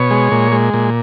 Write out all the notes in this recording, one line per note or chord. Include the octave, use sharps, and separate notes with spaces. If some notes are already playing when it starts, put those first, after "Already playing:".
Already playing: B2 C#5
G#3
A#2
G#3
A#2